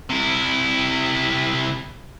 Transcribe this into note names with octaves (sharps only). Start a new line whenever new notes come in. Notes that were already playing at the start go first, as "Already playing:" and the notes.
C3 E4